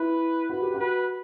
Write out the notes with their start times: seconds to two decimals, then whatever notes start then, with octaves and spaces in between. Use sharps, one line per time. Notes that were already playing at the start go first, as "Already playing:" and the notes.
Already playing: E4 B4
0.50 F#4 B4
0.62 G4
0.74 F#4
0.80 B4